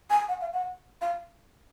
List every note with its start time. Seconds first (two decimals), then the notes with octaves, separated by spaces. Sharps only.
0.10 G#5
0.28 F#5
0.41 F5
0.53 F#5
1.01 F5